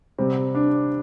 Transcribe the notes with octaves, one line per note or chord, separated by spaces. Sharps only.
C3 G3 C4
D4